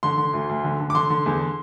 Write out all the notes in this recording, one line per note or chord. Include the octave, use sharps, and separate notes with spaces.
D3 C6
D3
D2
D2
D3
D3
D6
D3 C6
D3
E2